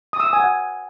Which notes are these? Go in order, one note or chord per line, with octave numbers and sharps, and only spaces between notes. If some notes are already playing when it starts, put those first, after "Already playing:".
D#6
E6
D#6
G#5
F#5